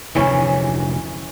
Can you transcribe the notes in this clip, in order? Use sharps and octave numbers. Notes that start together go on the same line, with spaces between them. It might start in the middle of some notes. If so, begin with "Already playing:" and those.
F1 D2 G#2 E3 C#4